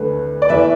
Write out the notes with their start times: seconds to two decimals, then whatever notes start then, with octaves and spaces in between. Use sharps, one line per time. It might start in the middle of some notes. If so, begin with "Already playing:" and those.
Already playing: D2 D3 A3 B4
0.42 D5
0.49 E2 E3 A3 B4 E5